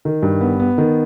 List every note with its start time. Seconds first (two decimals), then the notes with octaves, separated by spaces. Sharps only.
0.05 D#3
0.22 G2
0.41 B3
0.60 B3
0.78 D#3